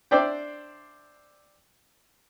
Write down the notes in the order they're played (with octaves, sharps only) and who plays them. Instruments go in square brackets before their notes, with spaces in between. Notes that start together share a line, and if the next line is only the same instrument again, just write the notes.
[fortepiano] D4 C5 D5 E5 G5